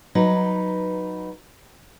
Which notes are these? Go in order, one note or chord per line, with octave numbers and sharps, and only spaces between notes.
F#3 D#4 B4